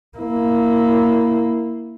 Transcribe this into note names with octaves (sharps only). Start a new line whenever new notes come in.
A#3 E4